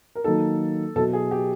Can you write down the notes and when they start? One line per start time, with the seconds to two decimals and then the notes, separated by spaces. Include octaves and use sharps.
0.15 A#4
0.24 D#3 F#3 A#3 D#4 A4
0.96 B2 F#3 B3 E4 A4
1.13 G#4
1.31 G4